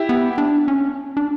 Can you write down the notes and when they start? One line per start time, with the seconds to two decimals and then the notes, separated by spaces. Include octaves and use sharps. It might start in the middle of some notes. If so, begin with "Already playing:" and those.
Already playing: E4 G4
0.09 B3
0.38 D4
0.68 C#4
1.17 D4